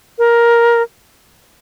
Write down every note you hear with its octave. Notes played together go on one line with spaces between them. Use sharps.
A#4